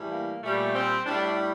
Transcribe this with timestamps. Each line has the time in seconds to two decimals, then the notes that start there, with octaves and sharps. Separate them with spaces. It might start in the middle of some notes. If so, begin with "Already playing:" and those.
Already playing: A2 E3 G3
0.12 A#3
0.43 A#2 G3 A3
0.74 C4
1.06 A2 G3 D4